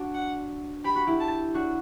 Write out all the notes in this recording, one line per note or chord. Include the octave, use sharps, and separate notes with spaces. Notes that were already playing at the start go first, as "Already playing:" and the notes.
Already playing: D4 F#4
F#5
G4 B5
F#4
E4 G4
A5
D4 F#4